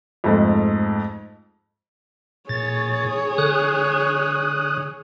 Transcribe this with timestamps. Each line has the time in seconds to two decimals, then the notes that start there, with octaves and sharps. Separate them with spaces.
0.24 F2 G#2 A3
2.49 A#2 G#4 C#5 A6
3.38 D3 D#6 F#6